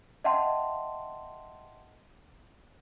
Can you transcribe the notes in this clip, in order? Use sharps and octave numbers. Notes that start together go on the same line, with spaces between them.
D#5 E5 F#5 G5 A5 C6